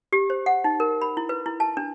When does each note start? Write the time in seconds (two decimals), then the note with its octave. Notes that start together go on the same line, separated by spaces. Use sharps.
0.13 G4
0.30 C5
0.46 F#5
0.64 D#4
0.80 A#4
1.02 B5
1.17 E4
1.29 B4
1.46 E4
1.60 A5
1.77 D4